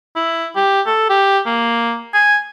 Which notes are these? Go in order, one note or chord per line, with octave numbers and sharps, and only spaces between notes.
E4
G4
A4
G4
A#3
G#5